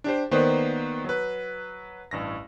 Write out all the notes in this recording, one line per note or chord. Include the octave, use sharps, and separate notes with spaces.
D4 G4 C5
D#3 A#3 B3 B4 C5 D5
F#3 B4
A1 G2 A#6